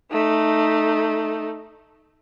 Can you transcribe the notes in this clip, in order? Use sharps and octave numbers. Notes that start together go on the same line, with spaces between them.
A3 D#4